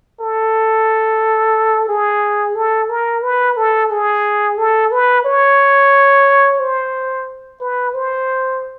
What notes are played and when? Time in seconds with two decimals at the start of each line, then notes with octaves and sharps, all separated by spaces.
0.20 A4
1.88 G#4
2.55 A4
2.89 A#4
3.23 B4
3.57 A4
3.90 G#4
4.58 A4
4.92 B4
5.24 C#5
6.59 C5
7.61 B4
7.94 C5